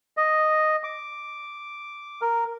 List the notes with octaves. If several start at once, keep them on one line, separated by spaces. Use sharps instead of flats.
D#5
D6
A#4